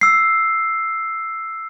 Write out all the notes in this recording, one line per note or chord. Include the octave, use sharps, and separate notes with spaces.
E6 C7